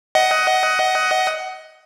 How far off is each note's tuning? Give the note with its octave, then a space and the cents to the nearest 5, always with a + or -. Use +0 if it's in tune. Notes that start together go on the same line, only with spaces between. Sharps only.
D#5 +15 F#5 +15